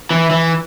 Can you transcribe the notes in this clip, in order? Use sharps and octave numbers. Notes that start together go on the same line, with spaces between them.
E3
E3